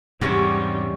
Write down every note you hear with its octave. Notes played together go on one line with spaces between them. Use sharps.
E2 G#2 C3 E3 G3 C#4 G4